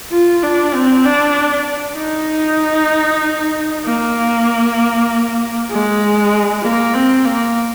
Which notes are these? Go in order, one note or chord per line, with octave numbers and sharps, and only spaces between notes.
F4
D4
C4
D4
D#4
A#3
G#3
A#3
C4
A#3